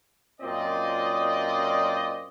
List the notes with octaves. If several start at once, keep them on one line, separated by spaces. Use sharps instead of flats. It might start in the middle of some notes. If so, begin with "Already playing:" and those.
F#2 A#2 C4 F4 D5 D#5